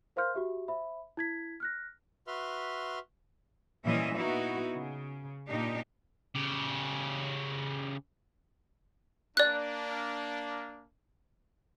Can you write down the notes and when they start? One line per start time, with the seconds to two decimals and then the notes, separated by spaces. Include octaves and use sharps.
0.16 A#4 C5 F5 C6 F6 G6
0.34 F#4 G4 E5
0.68 C5 E5 B5
1.17 E4 G#6 B6
1.60 F6 F#6 A#6
2.27 F#4 B4 E5 C6 F6
3.85 A#2 E3 G3 C#4 D#5 E5
4.16 B3 D#4 E4 F#4
4.74 C#3
5.48 A#2 D4 D#4 G4
6.35 C#3 G4
9.37 A#3 D4 D5 F#6